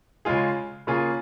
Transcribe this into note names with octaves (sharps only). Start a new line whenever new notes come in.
C#3 G#3 F4 G#4
C#3 A#3 C#4 F4 G#4